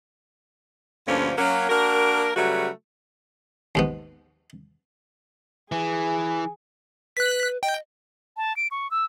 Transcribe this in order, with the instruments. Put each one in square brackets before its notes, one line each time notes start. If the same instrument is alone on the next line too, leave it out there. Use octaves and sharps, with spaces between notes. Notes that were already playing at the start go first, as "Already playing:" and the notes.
[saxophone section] D2 G2 D3 F3 A#3 C#4
F#3 A#3 C#4
A#3 D4 F#4 A#4
C#3 F#3 G3 A3 F#4 B4
[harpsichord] D#2 G#2 B3
[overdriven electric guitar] E3 [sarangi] G#4 [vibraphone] G#5
[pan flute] B4 [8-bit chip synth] F#6 B6
[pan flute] D#5 [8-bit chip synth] G5
[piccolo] A5
D7
C#6
E6